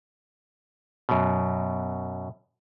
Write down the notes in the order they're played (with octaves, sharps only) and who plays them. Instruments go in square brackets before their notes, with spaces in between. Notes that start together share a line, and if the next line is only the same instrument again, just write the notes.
[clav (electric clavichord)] F#2 B2